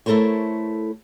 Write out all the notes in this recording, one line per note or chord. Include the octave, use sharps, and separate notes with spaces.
A3 E4 A4 A#4 C5 C#5